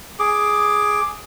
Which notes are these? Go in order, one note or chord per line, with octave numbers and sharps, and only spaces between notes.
G#4 D6